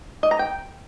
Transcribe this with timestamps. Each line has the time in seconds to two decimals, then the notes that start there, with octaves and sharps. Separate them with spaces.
0.23 D#5
0.31 A#5
0.39 G5